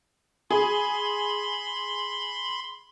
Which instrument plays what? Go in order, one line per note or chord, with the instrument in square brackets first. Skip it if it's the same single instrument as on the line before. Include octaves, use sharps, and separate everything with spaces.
[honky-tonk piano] G#4 [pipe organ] B5 C6